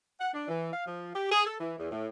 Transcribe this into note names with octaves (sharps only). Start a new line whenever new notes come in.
F#5
D4
E3
F5
F3
G4
G#4
A4
E3
E2
A2